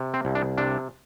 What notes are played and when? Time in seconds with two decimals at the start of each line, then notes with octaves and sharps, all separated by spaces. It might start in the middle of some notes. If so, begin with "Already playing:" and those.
Already playing: C3
0.14 C4
0.25 C2
0.35 D4
0.58 C3 D4